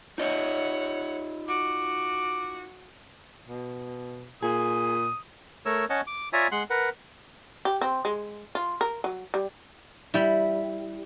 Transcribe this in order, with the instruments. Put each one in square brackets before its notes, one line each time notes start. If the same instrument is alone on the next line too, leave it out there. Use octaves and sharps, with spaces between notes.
[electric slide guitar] D#4 F4 D#5 [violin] C#5 F#5
[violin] F#4 [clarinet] D6
[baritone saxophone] B2
[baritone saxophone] A#2 [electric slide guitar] G#4 [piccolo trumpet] D#6
[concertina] A3 A#4 C#5 E6
C#4 C#5 D#5 F#5 A5
D6
F4 C#5 D5 E5 G#5 A#5
G#3 F#5 C6 F#6
A#4 B4 F#5
[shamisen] G4
C4
G#3
F4
A#4
F#3
G3
[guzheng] G3 E4